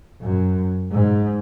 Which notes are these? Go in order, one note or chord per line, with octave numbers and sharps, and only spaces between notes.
F#2
G#2